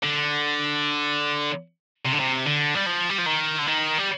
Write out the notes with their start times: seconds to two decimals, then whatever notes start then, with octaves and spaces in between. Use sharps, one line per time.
0.03 D3
2.05 C3
2.12 D3
2.19 C3
2.46 D3
2.75 G3
2.86 F3
3.09 G3
3.18 F3
3.26 D#3
3.59 D3
3.67 D#3
3.98 G3